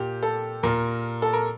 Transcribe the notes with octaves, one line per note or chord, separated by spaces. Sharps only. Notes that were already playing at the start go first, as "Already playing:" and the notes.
Already playing: A#2 G4
A4
A#2 A#4
A4
A#4